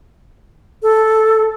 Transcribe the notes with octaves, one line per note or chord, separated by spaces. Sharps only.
A4